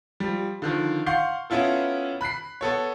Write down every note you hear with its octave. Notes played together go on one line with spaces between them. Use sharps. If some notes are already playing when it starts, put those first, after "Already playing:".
F3 G3
D3 D#3 F3
F5 F#5 C6 C#6 G6 C7
B3 C#4 E4 F4 A4
B5 F#6 B6 C7
B3 A4 C#5